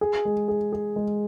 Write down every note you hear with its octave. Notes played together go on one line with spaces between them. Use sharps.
G#4
G#3
G#4
G#4
G#3